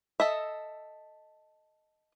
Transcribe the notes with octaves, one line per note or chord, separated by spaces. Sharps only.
A4 D#5 E5